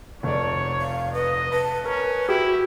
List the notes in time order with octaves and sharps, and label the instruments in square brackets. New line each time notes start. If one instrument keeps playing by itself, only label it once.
[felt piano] F1 D5 [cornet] C#5
[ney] F5
[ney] B4 [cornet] D#5
[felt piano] B4 [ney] A5
[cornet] C#4 [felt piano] A#4 [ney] B4
[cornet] E4 [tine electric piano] F#4 [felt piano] G4